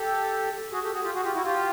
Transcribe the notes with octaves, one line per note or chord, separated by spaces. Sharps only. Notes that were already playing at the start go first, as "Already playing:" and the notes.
Already playing: G4 A4
F#4 G#4
G4 A4
F#4 G#4
F4 G4
F#4 G#4
F4 G4
E4 F#4
F4 G4